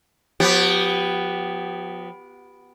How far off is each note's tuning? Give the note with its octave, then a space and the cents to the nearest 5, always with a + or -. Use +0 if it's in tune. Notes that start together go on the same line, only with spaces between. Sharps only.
F3 +45 B3 +0 G4 +0